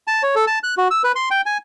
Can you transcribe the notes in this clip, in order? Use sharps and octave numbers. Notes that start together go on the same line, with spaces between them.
A5
C#5
A4
A5
F#6
F#4
E6
B4
C6
G5
G#5